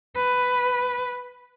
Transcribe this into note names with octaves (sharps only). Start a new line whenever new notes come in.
B4